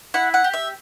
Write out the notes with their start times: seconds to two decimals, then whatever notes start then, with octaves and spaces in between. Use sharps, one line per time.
0.14 E4 F#5
0.34 F#5
0.44 G4
0.54 E5